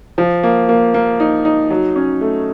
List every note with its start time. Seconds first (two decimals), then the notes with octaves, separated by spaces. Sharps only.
0.18 F3
0.43 A#3
0.69 A#3
0.94 A#3
1.20 D#4
1.45 D#4
1.70 F#3
1.96 C#4
2.21 A3